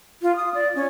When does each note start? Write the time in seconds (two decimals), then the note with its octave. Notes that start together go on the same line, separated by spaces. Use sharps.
0.22 F4
0.36 D#6
0.54 D5
0.75 C#4